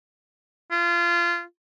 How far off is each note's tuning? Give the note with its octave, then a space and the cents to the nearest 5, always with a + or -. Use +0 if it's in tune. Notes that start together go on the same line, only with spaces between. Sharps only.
F4 -25